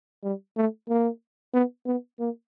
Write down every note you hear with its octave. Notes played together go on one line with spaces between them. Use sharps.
G3
A3
A#3
B3
B3
A#3